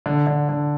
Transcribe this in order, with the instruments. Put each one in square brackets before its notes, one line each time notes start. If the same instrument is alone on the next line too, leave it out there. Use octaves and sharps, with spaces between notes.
[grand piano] D3
D3
D3